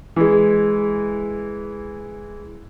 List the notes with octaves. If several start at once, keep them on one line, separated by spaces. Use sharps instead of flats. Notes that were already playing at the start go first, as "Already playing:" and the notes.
E3 G#3